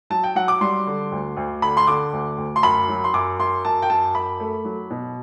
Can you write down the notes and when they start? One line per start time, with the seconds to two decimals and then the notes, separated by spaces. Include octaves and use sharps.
0.10 F#3 A5
0.24 G5
0.35 F#3 F#5
0.48 D6
0.61 G3 C6
0.87 D3
1.12 D2
1.37 D2
1.62 D3 B5
1.77 C6
1.87 D3 D6
2.13 D2
2.38 D2
2.56 C6
2.63 F#2 B5
2.89 F#3
3.04 C6
3.13 F#2 D6
3.39 F#2 C6
3.65 F#2 A5
3.82 G5
3.90 F#2 A5
4.15 F#2 B5
4.40 A3
4.65 F#3
4.90 B2